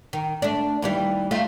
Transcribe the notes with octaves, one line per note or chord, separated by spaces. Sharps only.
D#3
A3 D4
D#2 E3 G3
A3 D#4 F4